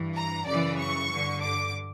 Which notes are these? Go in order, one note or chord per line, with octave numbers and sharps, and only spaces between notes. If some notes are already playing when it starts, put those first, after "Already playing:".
Already playing: G2 E3
A#5
F#2 C#3 E3 D5
C#6
G2 D3
D6